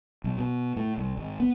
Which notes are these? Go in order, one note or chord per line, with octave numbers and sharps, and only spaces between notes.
B1
B2
A2
C2
G#1
B3